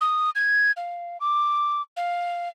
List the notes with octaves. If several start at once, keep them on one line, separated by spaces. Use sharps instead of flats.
D#6
G#6
F5
D6
F5